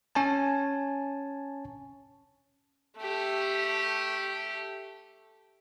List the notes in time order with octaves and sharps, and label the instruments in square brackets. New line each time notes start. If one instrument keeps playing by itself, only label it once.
[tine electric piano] C#4 C#5 G#5 A5
[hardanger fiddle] A3 G4